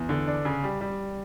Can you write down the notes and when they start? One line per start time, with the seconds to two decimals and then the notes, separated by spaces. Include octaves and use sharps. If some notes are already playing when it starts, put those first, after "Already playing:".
Already playing: E2
0.09 D3
0.28 D4
0.45 C#3
0.64 G3
0.81 G3